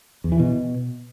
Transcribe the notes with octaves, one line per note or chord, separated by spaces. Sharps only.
E2
E3
B2